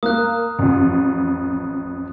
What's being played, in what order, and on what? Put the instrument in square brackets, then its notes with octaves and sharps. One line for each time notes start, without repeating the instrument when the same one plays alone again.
[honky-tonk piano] A#3 [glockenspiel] D#6 F#6
[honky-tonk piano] A1 F2